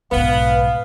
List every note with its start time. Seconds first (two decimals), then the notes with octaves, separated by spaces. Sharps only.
0.12 B1 G#2 B3 F5